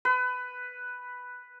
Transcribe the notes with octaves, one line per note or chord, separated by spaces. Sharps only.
B4